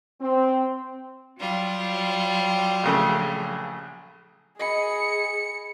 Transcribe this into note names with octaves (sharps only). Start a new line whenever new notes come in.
C4
F#3 G3 F4
A#1 C#3 A3
G#4 D#5 G#5 B5 C#7